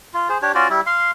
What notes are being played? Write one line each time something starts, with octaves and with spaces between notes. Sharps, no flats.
F4
G#4 C5
D4 G4 C#5
C#4 F4 F#4 D5
G3 E4
F5 C6